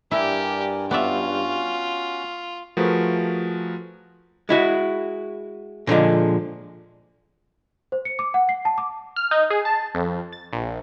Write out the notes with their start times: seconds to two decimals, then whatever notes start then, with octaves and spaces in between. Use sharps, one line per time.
0.11 G2 E4 G4 A#4 D5 G#5
0.91 B3 C#4 F4 F#4 D5 E5
2.77 F3 A3 F#4 G#4 A#4 B4
4.49 G#3 E4 F#4
5.87 A#2 D3 F3 G#3
7.92 C5
8.05 C#7
8.19 D6
8.34 F#5
8.49 C7
8.65 A5
8.78 D6
9.16 F6
9.31 D#4
9.50 G#4
9.65 A5
9.95 F2
10.33 A6
10.53 A#1